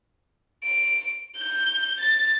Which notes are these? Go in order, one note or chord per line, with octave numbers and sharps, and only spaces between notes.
D7
G6
A6